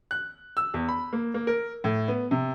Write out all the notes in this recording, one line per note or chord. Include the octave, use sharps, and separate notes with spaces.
F#6
E6
E2
B5
A#3
A#3
A#4
A2
B3
C3